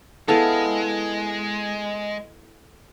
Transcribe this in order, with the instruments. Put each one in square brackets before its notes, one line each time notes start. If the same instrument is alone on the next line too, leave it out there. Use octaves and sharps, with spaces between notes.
[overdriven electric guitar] G#3 [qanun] B3 E4 F5 [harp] A4